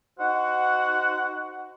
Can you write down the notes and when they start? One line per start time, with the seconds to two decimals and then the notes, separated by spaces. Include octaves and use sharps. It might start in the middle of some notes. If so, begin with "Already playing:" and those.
0.19 D#4 F#4 C5 F#5